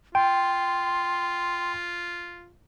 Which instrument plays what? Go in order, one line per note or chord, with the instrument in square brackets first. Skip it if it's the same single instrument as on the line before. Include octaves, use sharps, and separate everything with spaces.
[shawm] F4 [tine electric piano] G5 [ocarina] C6